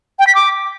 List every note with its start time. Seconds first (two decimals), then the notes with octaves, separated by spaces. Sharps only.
0.19 G5
0.27 B6
0.35 D6